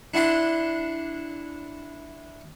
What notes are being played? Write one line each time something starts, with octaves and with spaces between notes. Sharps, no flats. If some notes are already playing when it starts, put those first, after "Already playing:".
D4 E4 F#5 C6